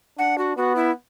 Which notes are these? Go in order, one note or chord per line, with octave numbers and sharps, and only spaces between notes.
D4 F#5
F#4
B3 F#4
E4